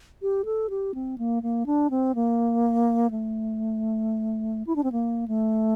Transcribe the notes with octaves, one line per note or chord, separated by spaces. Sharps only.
G4
A4
G4
C4
A#3
A#3
D4
C4
A#3
A3
E4
D4
C4
A#3
A3